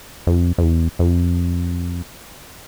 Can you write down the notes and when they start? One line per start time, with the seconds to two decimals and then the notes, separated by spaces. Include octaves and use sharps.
0.27 F2
0.58 F2
0.63 E2
0.99 F2